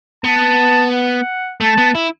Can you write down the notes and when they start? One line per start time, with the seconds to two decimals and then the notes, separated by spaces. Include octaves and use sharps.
0.24 B3 A5
0.93 F#5
1.61 A3 A5
1.78 B3
1.95 E4